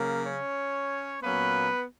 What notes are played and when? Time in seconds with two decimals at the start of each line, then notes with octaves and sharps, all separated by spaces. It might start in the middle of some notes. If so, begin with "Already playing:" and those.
Already playing: C#3 F#3 A#3 A#4
0.24 C#4 C#5
1.22 A#2 F#3 A#3 B3 C#4 B4